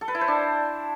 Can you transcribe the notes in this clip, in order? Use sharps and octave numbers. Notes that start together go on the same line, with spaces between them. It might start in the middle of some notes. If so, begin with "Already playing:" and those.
A4
B4
E4
C5
D4